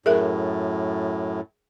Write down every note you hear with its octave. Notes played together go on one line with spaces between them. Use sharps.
F#2 A2 G#4 A#4 E5